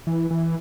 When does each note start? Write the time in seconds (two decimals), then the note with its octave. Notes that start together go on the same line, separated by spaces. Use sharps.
0.07 E3
0.30 E3